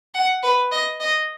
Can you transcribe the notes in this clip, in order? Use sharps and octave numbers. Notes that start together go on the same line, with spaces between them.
F#5
B4
D#5
D#5